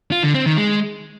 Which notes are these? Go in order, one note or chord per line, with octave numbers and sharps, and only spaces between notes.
F4
D3
C4
D#3
G#3